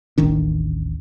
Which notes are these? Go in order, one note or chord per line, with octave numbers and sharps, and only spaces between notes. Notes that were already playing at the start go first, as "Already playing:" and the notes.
D#1 A1 D#3 D4